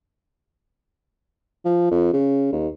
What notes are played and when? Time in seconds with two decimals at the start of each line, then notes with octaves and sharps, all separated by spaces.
1.65 F3
1.91 F2
2.13 C#3
2.53 D#2